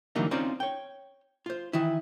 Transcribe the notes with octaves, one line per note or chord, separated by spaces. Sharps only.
D3 E3 F#3 G3 A#3 D#4
C4 C#4 D#4 F4 C5 D5
C#5 G5
F4 C5
D#3 E3 E4